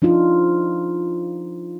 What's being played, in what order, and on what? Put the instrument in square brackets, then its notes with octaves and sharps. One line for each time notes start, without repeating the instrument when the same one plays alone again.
[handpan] F3 D4 D#4 F4